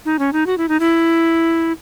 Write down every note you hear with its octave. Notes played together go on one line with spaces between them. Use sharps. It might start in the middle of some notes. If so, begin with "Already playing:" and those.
D#4
C#4
D#4
F#4
E4
D#4
E4